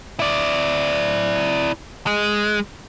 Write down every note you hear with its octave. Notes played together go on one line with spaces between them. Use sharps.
E4 D5
G#3